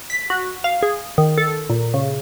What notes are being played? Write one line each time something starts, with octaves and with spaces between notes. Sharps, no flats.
B6
F#4
F5
G#4
D#3
A4
A#2
C#3